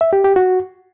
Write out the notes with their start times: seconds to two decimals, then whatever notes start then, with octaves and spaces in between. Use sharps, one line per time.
0.01 E5
0.13 G4
0.24 G4
0.36 F#4